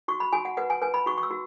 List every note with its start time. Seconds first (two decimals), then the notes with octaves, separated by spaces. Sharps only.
0.08 F#4 C#6
0.20 B5
0.32 F#4 G#5
0.45 F#5
0.57 B4 F#5
0.70 G#5
0.82 B4 G#5
0.94 B5
1.06 F#4 C#6
1.18 C#6
1.23 E6
1.31 F#4